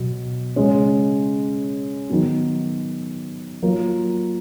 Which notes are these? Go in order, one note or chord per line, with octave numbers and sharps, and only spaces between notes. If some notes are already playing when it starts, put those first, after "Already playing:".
Already playing: B2 F#3 B3
C#3 G#3 C#4
D#3 F#3 B3 F#4
F#3 A#3 F4 A#4